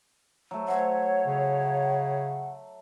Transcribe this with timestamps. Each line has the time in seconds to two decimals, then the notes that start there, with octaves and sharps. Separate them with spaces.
0.51 F#3 A3
0.68 C5 C#5 E5 F#5
1.27 C#3